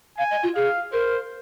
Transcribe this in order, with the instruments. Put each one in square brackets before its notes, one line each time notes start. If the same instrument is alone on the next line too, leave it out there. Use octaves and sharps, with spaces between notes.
[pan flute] F5 [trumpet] G#5
[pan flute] D#5
F4
[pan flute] G#4 [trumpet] F5
[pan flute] A#4 [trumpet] C5